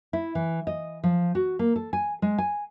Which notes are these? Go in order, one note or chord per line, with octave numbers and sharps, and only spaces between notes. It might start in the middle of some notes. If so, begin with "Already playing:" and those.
E4
E3
D#5
F3
F#4
A#3
A4
G#5
G#3
G#5